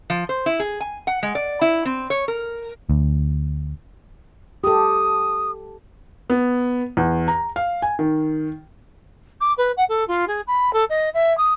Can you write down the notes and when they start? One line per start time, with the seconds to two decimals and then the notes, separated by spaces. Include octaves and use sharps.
0.10 F3
0.29 C5
0.46 E4
0.60 G#4
0.81 G#5
1.07 F#5
1.23 G#3
1.35 D5
1.61 E4
1.85 C4
2.10 C#5
2.28 A#4
2.90 D2
4.64 G4 A4 D#6
6.30 B3
6.97 E2
7.28 A#5
7.56 F5
7.82 G#5
7.99 D#3
9.41 D6
9.58 B4
9.77 F#5
9.89 A4
10.08 F4
10.28 G#4
10.47 B5
10.73 A4
10.90 D#5
11.14 E5
11.37 D#6